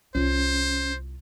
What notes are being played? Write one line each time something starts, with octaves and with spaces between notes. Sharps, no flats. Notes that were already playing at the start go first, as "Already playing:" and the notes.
C2 C#4 F4 C5